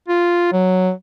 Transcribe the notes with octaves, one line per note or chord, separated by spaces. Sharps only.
F4
F#3